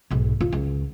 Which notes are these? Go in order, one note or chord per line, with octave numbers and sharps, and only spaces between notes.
B1 G#2
D#1 F4
C#2